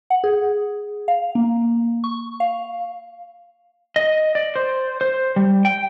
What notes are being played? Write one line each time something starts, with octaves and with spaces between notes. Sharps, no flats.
F#5
G#4
F5
A#3
C#6
F5
D#5
D5
C5
C5
G3
G5